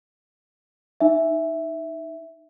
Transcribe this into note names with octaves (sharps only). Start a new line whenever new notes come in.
D#4 E5